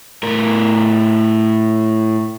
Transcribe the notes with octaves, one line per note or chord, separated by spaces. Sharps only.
A2 A#4